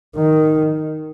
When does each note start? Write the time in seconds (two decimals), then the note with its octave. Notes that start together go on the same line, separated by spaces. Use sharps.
0.16 D#3